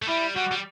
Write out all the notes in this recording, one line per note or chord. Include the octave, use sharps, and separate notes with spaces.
A3
G3 E4
G3 F#4
G3